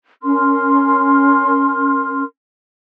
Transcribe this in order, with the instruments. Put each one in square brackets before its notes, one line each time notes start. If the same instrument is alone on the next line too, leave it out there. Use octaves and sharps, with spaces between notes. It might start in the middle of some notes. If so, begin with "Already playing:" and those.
[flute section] C#4 A#4 C6 F6